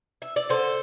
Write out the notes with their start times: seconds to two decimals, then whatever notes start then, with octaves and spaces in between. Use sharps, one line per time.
0.22 E5
0.36 D5
0.49 D3 A4 C5